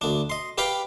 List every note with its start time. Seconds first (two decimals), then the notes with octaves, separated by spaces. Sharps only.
0.01 D2 D4
0.30 D#5 C6
0.58 G4 B4 D5 F5 G5